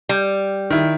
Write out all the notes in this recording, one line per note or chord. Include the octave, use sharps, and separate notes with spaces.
G3
D#3 E4